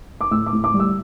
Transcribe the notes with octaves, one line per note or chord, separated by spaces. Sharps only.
D6
A2 E6
D6
A2
D6
G3
E6